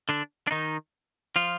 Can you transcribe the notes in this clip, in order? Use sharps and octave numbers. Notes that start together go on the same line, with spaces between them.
D3 D4
D4
D#3 D#4
F3 F4